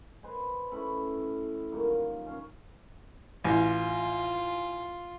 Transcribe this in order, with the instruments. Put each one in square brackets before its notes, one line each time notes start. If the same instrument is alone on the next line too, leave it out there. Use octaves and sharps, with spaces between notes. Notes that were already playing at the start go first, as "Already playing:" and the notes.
[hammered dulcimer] B4 C5 D#5 G#5
A2 C#4 A4 B5
A#2 D#3 F#3 G3
C#4 F5
[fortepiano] A1 [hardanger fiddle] F4